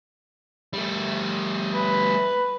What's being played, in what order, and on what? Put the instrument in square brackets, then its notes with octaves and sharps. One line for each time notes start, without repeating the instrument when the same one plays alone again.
[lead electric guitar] G3 A3
[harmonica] B4